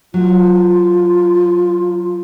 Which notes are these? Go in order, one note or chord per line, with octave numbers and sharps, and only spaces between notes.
F#3 A3 F4